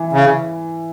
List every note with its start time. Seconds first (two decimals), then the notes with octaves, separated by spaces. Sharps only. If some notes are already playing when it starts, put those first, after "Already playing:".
Already playing: E3
0.13 C#3